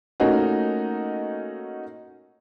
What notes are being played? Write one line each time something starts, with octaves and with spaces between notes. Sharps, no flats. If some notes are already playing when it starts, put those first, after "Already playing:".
A3 A#3 C#4 D#4 F4 F#4